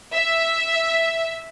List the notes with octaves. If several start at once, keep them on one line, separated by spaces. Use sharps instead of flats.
E5